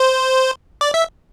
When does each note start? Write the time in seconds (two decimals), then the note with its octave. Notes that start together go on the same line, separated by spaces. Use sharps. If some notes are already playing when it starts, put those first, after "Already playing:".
Already playing: C5
0.81 D5
0.94 E5